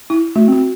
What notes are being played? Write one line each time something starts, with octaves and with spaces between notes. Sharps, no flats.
E4
A3 F#4
C4 F#4